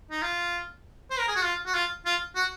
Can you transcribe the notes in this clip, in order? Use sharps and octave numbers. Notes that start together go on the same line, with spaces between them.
D#4
F4
C5
A#4
G#4
F#4
F4
F#4
F4
F4
F#4